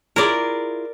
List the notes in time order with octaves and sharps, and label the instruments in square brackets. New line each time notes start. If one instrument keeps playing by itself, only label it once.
[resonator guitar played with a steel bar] E4 F4 G#4 [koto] A#4 D5